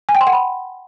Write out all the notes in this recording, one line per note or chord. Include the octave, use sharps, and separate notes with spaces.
G#5
G5
C6
F#5
B5